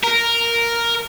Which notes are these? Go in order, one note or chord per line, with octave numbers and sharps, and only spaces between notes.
A#4